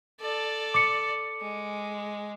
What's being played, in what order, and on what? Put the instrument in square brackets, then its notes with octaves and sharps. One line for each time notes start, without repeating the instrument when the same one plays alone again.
[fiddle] A4 D5
[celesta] D6 C#7
[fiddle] G#3